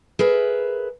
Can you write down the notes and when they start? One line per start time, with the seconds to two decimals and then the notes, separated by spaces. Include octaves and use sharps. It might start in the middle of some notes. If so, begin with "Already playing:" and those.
0.19 G#4 A#4 B4 E5